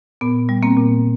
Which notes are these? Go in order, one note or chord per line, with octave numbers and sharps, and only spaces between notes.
A#2 B3
G3
A#3 C4
A#2